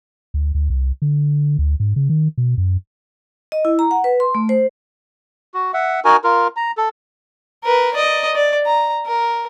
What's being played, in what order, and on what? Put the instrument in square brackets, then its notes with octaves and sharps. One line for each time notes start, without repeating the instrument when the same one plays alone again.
[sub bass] D2
D2
C2
D3
D2
G#2
C#3
D#3
B2
F#2
[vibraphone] D#5
E4
A#5
F#5
B4
C6
A3
C5
[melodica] F#4
E5 F#5
D#4 F#4 A#4 G#5
F4 A#4
A#5
A4
[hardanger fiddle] A#4 B4
D5 D#5
D5
A#5
A#4